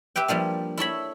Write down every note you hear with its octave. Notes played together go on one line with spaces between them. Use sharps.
G4 B4 E5 G5
F3 G3 A#3 D4
E4 A4 C#5 B5